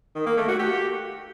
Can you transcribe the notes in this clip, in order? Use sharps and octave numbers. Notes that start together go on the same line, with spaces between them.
D#3
A#3
A3
F#4
G4